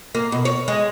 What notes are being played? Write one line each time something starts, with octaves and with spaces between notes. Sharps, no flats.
A#3
B2
C#5
G#3